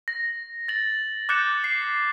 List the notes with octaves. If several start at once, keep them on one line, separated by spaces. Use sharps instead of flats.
A#6
A6 F#7
D6 F#6 G6 A6 C#7 E7
C7